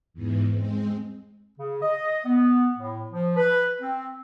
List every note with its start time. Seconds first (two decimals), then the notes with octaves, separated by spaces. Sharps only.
0.14 E2 G#2 E3
0.55 G#3 C4
1.58 C#3
1.83 D#5
2.25 B3
2.76 A2
3.12 F3
3.36 B4
3.81 C4